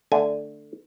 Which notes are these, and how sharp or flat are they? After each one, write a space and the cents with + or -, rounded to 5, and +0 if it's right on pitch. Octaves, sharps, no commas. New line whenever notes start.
D3 +0 A3 +0 G#5 +0